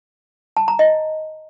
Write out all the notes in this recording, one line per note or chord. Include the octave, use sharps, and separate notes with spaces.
A5
A#5
D#5